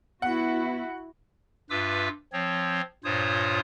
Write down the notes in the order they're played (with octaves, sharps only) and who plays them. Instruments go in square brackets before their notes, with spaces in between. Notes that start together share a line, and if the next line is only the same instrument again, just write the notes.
[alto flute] B3 [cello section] E4 F#4 [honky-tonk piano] F#5
[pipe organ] G2 F4 B4 E5 D6 E6
F3 C4 C#5
G2 A#2 F4 C5 C#5 D#6